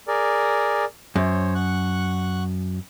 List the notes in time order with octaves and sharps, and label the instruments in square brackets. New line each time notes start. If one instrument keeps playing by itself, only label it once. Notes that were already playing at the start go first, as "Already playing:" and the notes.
[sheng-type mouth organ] G#4 A#4 D5
[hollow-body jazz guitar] F#2 [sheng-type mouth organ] C5 C#5
[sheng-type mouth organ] F#5 C#6 F#6